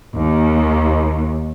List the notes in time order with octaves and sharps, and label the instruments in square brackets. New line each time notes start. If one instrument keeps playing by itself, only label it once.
[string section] D#2